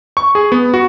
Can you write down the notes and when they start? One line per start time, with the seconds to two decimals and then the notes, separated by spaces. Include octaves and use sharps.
0.17 C#6
0.35 G#4
0.52 B3
0.74 F#4